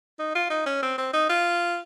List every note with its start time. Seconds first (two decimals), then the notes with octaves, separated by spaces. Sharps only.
0.19 D#4
0.35 F4
0.50 D#4
0.66 C#4
0.82 C4
0.98 C4
1.13 D#4
1.29 F4